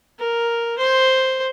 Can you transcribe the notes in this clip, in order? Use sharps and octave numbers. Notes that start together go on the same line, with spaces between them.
A#4
C5